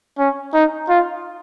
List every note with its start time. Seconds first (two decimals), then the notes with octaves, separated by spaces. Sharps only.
0.19 C#4
0.54 D#4
0.89 F4